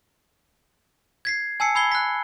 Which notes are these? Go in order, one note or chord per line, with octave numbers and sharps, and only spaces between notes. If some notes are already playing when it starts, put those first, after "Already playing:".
G#6 B6 C7
G#5 A5 E6 C7 C#7
B5 E6 G#6 C7 G7
F#6 B6